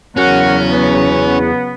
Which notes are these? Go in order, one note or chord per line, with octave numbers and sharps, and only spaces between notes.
E2 C#3 F#3 C#4 F#4 A#4 F#5
B3